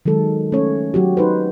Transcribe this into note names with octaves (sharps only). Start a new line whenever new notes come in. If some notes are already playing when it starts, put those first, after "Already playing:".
D#3 F#3 G#3 A4
A3 C#4 C#5
F#3 F#4 G4
D#4 B4 C5